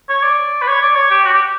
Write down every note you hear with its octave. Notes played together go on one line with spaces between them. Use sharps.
C#5
D5
B4
C#5
D5
C#5
G4
F#4
G4